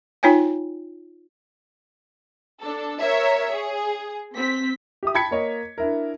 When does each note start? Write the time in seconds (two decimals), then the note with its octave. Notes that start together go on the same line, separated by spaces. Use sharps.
0.23 D#4 F4 C#5 G5 G#5
2.62 D4 A4
3.01 A#4 C#5 E5
3.53 G#4
4.35 C4 B6
5.03 G4 E5 D#6
5.15 G5 A5 B5 G#6 B6 C#7
5.31 A#3 C#5 D#5
5.78 D4 E4 A#4